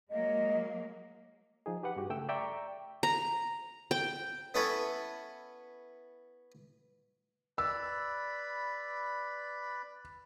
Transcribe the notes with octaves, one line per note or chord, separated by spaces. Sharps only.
F#3 G#3 A#3 D#5
F3 D#4 G#4
G4 B4 F#5
G2 F#4 G4
C#3 A3 G5 E6
D5 E5 G5 A#5 C#6
A#5
G5
B3 C#4 E4 A4 B4 C#5
B4 D5 B5 E6